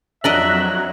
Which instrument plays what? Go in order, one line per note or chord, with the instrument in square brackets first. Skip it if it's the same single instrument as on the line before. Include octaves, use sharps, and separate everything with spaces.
[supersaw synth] F2 F#3 [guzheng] D4 A#4 D#5 [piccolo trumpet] E5 [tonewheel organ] A#5 F#6